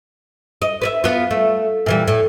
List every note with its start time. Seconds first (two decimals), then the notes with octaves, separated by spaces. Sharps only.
0.62 D#5
0.81 B4 D5 E5
1.04 B3 F4
1.31 A3
1.86 A#2 E3 G3
2.08 A2